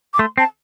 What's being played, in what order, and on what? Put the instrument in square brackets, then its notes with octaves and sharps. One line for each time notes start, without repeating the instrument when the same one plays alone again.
[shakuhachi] D6
[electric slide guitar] A3 [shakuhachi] C6
[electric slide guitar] C4 [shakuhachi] A5